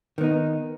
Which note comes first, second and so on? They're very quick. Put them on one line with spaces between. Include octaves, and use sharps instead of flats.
D#3 B3 D#4